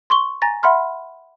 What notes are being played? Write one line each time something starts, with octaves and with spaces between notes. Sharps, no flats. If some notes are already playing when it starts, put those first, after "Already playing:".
C6 C#6 G7
G#5 A#5 A6 A#6
E5 F#5 B5 C6 F6